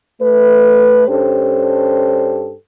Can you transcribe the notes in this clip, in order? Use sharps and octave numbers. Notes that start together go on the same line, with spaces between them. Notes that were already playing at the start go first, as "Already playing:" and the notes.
A3 B4
G2 C#4 D4 G4 A4 C5